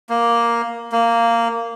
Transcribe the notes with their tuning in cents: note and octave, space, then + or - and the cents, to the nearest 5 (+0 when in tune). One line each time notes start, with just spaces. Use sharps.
A#3 +5
A#3 -10